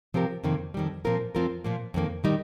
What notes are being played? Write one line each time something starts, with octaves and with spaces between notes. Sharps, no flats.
C3 F3 C4 G4 A#4
F2 C3 D#3 A#3
F2 D#3 G3
A#2 F3 C4 F4 A#4
F2 F3 C4 F4 A#4
A#2 F3 A#3
F2 D#3 A#3
D#3 G3 D#4